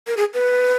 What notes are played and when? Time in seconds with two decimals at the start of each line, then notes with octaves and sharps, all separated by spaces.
0.07 A#4
0.17 G#4
0.34 B4